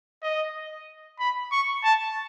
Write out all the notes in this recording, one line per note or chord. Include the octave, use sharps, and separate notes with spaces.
D#5
B5
C#6
A5